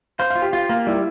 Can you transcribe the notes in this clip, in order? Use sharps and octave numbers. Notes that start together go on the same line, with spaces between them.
C5 F5
F5
F4
G4
F4
A#3
G3 E4